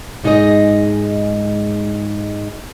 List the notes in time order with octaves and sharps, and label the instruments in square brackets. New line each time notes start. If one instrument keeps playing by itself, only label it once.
[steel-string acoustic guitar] G#2 G#3 D#4 E4 G#4 D#5